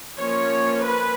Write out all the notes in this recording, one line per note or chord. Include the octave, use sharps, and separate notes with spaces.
F3 A#3 C#4 C#5
B4